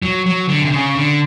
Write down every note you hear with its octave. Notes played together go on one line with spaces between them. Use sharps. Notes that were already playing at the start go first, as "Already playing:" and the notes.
F#3
F#3
D3
C3
C#3
D3